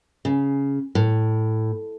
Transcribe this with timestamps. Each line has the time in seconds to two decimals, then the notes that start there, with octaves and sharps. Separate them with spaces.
0.25 C#3
0.95 A2